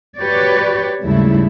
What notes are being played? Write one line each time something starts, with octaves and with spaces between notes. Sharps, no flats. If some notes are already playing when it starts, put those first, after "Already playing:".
F#4 G4 B4 C#5 D5
D#2 G#2 C#3 G3 A3 E4